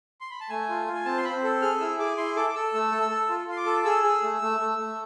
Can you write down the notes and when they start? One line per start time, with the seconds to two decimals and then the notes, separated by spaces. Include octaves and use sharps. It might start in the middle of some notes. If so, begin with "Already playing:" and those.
0.21 C6
0.30 B5
0.41 A5
0.49 A3 G#5
0.69 F4
0.87 F4
0.94 G#5
1.05 C4 A5
1.17 C6
1.24 C4 B5
1.44 A4
1.62 G#4 F6
1.80 E4 E6
1.99 G#4 D6
2.17 E4 C6
2.36 A4 D6
2.50 D6
2.55 A4 E6
2.74 A3 E6
2.92 A4
3.01 E6
3.10 A4
3.29 F4
3.48 F4 C6
3.57 D6
3.66 A4
3.85 G#4 E6
4.04 G#4
4.23 A3
4.42 A3
4.60 A3
4.78 A3